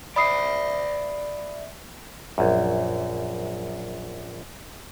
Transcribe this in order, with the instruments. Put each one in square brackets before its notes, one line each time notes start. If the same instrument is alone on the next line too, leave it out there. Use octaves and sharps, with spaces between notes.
[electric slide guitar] D5 E5 [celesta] B5 D#6 C7
[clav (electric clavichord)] A#1 F#2